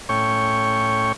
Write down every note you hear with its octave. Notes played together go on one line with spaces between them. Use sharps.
A2 C#4 C#5 G5 C#6